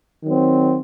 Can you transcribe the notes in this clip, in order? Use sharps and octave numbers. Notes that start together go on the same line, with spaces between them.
D#3 F#3 C4